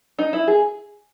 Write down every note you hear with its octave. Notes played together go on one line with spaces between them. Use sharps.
D#4
E4
G#4